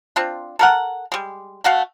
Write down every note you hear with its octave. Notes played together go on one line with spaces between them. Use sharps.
C4 D4 F4
A4 A#4 F#5
G3 G#3
A3 F#4 F5 F#5